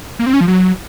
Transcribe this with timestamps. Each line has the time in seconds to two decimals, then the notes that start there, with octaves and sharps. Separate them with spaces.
0.19 A#3
0.26 C4
0.33 C#4
0.41 F3
0.48 F#3